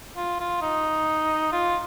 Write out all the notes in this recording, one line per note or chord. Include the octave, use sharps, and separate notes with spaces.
F4
F4
D#4
F4